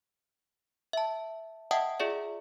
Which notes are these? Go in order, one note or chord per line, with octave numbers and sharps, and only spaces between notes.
E5 A5
D#5 E5 F#5 G5 A5 D#6
F4 G#4 D5 E5